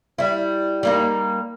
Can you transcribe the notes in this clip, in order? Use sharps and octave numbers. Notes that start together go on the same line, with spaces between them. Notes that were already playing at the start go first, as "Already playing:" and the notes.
G3 E4
G3 A#3 D#4